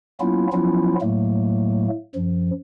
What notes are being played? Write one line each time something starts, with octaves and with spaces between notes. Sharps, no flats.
F#3 A#3 B3 C#4 E4 F4
F3 F#3 B3 C#4 E4 F4
A2 F#3 A3 A#3
F#2 F3